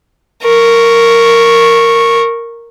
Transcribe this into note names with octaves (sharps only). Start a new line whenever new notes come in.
A#4 C#6